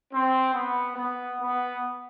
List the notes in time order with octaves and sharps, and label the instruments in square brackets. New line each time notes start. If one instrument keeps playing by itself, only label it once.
[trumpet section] C4
B3
B3
B3